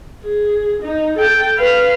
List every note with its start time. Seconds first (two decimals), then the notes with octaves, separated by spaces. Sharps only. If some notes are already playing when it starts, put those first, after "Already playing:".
0.24 G#4
0.82 D#4
1.17 A4 G5
1.58 B4 F5